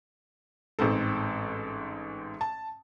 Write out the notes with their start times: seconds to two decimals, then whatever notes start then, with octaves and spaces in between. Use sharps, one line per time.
0.79 A1 G#2 C4 A4
2.41 A5